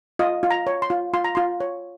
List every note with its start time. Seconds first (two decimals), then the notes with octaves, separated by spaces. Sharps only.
0.19 F4 D#5
0.43 F4
0.51 A#5
0.67 C#5
0.82 C6
0.90 F4
1.14 F4 C6
1.24 A#5
1.35 F4 C6
1.60 C#5